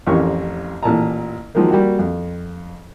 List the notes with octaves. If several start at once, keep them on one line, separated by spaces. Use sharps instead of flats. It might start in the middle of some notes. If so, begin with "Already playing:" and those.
A1 F2 C#4 G4 A#4 C#6
A1 A#2 A5 A#5
D#3 F3 F#3 G#3 A#3
G3 A#3 F#4 G4
F2